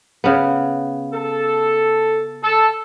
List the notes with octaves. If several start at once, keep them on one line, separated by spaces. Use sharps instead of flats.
C#3 B3
A4
A4